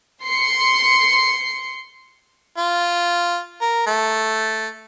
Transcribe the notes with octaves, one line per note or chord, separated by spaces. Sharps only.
C6 C7 C#7
F4
A#4
A3